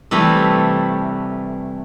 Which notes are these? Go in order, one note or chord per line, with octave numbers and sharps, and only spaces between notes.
C3 E3 G3 A3